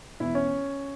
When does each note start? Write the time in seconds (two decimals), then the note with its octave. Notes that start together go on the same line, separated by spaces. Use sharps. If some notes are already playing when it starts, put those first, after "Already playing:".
0.20 E1 E2 E3 E4 E5
0.35 C#4 C#5